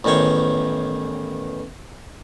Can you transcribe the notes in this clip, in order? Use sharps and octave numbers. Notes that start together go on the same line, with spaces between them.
A1 E2 D#3 C5 C#5